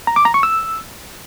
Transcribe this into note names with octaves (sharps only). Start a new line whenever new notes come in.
A#5
D6
A#5
C#6
E6